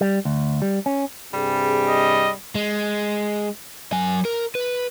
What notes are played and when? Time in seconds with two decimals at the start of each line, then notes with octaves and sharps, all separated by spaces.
0.01 G3
0.25 D2
0.62 G3
0.86 C#4
1.33 G2 C3 G3 G#4
1.88 D#5
2.55 G#3
3.92 F#3 G#5
4.25 A#4
4.55 B4